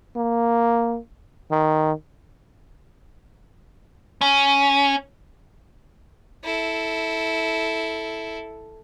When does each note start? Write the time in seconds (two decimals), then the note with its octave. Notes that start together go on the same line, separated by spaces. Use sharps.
0.16 A#3
1.51 D#3
4.21 C#4
6.43 E4 A4